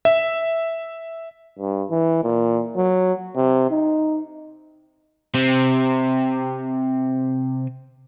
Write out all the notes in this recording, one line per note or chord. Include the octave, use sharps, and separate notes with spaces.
E5
G2
E3
A#2
F#3
C3
D#4
C3 C4